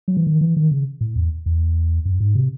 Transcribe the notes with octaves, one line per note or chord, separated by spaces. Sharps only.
F#3
E3
D#3
E3
D#3
C#3
A2
E2
E2
F#2
G#2
C3